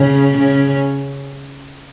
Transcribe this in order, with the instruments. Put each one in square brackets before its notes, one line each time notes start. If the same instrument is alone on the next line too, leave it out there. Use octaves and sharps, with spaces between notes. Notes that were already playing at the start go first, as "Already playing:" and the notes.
Already playing: [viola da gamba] C#3 C#4
C#3 C#4